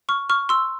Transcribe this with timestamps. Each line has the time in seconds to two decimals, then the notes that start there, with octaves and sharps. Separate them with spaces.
0.09 C#6 F6
0.29 C#6 F6
0.49 C6 E6